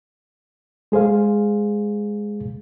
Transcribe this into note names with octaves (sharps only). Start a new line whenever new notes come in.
G#3 G#4 C5 F5